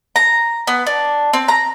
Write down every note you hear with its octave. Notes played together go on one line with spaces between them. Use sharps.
A#5
B3
D4
C4
A#5